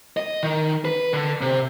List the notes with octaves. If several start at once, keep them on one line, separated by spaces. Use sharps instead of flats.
D#5
D#3
B4
D3
C3